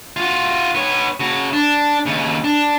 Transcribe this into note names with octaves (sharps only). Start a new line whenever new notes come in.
F4 F#4
B3 C#5
C#3 F#4
D4
D#2 C#3
D4